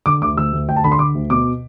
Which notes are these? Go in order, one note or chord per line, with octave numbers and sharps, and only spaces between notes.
D3 D6
D2 D6
D2 E6
D2
D2 G5
A5
D3 B5
C6
D3 D6
D2
B2 D6